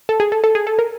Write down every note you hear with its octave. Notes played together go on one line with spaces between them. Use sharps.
A4
G#4
A4
A4
G#4
A4
A#4